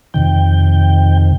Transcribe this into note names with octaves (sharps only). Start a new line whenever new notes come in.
F2 C3 D#3 G5